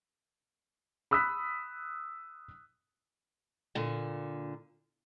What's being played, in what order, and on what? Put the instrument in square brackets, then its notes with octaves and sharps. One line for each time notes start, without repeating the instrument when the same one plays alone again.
[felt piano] B5 D#6 E6 F#6 B6
[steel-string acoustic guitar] A#2 D3